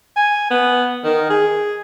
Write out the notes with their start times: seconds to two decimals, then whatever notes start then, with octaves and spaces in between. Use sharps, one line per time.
0.16 G#5
0.51 B3
1.04 D#3
1.30 G#4